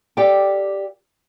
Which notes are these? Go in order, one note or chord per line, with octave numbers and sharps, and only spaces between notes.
G4 A4 D5 F5 G5